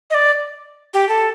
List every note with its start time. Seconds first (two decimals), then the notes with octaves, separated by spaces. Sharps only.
0.10 D#5
0.14 D5
0.94 G4
1.09 A4